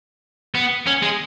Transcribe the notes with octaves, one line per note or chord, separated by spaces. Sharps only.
B3
C#4
G#3